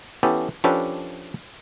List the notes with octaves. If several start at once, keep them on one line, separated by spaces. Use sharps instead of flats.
E3 B3 C#4 G4 A4
F3 C#4 D4 G4 A4 B4